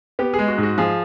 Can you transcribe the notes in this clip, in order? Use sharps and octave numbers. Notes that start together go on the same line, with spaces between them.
B3 G4
G#4
G#3
F#4
G#2
F#4
F3 G#4